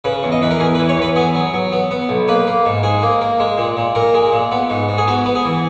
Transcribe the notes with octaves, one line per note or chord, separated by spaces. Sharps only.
C#3 B4
E2
D#5
E2 B4
A#4
E2 G#4
B4
E3
C#5
E2 B4
B3 G#4
F#3
F#3
B3
B3
B1
A#3 B4
A#3
G#2
G#2 G#4
A#3
A#3
G#3
A#2
A#2
A#2 A#4
G#3
A#2
B3
G#2
G#2
G#4
B3 F#4
B3
G#4
E3